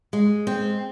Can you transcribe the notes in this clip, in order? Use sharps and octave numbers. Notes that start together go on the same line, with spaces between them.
G#3
C4